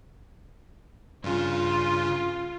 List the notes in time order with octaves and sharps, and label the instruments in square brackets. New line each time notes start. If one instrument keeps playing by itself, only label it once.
[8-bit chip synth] G2 C#3 [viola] F4